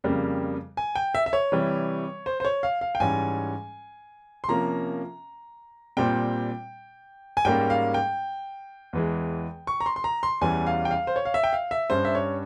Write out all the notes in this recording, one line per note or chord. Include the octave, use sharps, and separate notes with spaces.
F2 C#3 G3 A#3
G#5
G5
E5
E5
C#5
C3 E3 G3
C5
C5
C#5
F5
F5
G5
G#2 E3 G3 C#4 G#5
C6
C3 F3 A#3 C#4 A#5
A#2 G3 C4 G5
G#5
G#2 G3 A#3 C#4 G5
F5
G5
E2 E3 G#3
C#6
A#5
C6
C6
A#5
C6
E2 E3 G3 C#4 G#5
F5
G5
F5
C5
C#5
F5
E5
G5
F5
E5
G2 G3 C#4 C5
E5
C#5